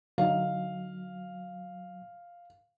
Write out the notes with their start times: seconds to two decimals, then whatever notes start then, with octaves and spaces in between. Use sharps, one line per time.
0.18 D3 F#3 D#4 F5